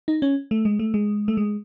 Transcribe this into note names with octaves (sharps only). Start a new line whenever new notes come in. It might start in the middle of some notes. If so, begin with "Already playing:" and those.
D#4
C#4
A3
G#3
A3
G#3
A3
G#3